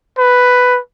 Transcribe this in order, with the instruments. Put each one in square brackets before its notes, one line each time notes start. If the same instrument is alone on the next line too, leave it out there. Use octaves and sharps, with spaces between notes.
[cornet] B4